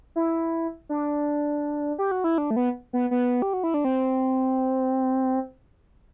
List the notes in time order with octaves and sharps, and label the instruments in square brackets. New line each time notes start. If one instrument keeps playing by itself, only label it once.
[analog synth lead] E4
D4
G4
F#4
E4
D4
A3
B3
B3
B3
G4
F#4
E4
D4
C4